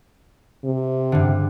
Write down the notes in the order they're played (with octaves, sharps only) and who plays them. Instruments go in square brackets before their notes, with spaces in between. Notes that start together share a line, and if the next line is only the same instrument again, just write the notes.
[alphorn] C3
[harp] G2 D3